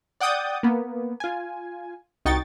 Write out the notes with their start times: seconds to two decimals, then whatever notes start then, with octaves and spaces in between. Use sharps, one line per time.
0.20 D5 F#5 G5 D#6 G6 A6
0.63 A#3 B3
1.20 F4 G#5
2.25 C2 D#4 F#4 G5 C#6 A6